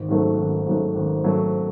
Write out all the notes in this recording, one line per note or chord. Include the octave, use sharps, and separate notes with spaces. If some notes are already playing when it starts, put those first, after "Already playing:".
Already playing: G#1
G#2 F#3 A3
G#1
G#2 F#3 A3
G#1
G#2 F#3 A3